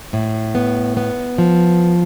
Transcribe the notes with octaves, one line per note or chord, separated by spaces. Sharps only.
A2
B3
B3
F3